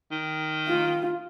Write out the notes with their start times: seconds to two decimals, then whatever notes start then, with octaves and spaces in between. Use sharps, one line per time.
0.12 D#3
0.68 F4